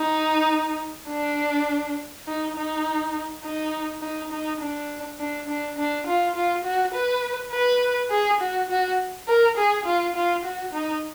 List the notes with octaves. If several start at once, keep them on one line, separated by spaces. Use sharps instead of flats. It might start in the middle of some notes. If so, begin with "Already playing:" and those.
Already playing: D#4
D4
D#4
D#4
D#4
D#4
D#4
D4
D4
D4
D4
F4
F4
F#4
B4
B4
G#4
F#4
F#4
A#4
G#4
F4
F4
F#4
D#4